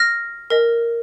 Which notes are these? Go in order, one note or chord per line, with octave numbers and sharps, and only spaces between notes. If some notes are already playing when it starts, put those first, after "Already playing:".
Already playing: F6 A#6
A#4 D#5